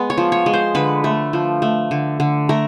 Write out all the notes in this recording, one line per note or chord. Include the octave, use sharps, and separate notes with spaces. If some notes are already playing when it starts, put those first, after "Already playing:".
Already playing: G#3 B3
C#5
F3
C#5
G#3
C5
D3 B4
A3
F3
A3
D3
D3
A3 A#4